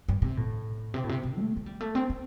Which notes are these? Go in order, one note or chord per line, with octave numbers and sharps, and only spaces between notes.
G2
C3
A2
C3
A2
C3
C3
A3
A3
G3
A3
C4
C4